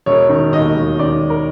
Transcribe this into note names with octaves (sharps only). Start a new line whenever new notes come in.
E1 C#5
D#3
D#2 D#5
E1
D#3 D5
E1
A#4